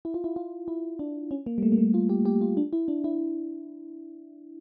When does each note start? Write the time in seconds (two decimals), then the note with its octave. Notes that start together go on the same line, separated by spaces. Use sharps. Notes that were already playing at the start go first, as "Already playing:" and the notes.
0.05 E4
0.14 F4
0.24 E4
0.36 F4
0.68 E4
0.99 D4
1.31 C#4
1.46 A#3
1.58 G3
1.63 A3
1.72 A#3
1.78 A3
1.94 F4
2.09 G4
2.25 G4
2.41 F4
2.57 D4
2.73 E4
2.88 D4
3.04 E4